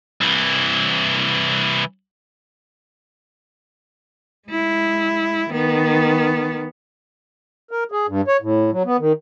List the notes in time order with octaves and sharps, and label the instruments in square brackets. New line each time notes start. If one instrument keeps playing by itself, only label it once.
[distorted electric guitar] C2 E3
[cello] G#3 E4
D#3 B3
[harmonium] A#4
G#4
G2
C#5
A2
F#3
B3
D#3